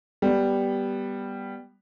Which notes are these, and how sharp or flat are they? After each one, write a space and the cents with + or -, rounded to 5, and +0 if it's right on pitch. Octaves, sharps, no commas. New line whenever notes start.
G3 +0 B3 -5